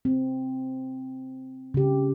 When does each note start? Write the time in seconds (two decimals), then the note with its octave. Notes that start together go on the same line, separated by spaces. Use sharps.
0.05 C4
1.74 C#3 G4